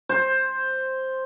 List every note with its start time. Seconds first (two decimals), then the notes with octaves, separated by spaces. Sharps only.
0.09 C5